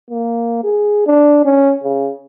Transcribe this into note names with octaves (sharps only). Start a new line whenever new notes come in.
A#3
G#4
D4
C#4
C#3